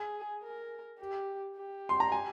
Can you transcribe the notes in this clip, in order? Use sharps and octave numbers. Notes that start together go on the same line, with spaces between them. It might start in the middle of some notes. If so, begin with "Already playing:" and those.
Already playing: G#4
A#4
G4
G4
C6
A#5
G#5